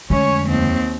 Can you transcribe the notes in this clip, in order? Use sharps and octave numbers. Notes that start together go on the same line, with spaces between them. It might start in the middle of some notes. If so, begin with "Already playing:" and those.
F2 D3 G#3 A3 C#4 C#5
D#2 C4